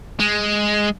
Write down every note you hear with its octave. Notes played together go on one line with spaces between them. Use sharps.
G#3